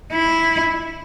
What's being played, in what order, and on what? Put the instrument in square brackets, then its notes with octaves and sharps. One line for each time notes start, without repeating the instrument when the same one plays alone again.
[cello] E4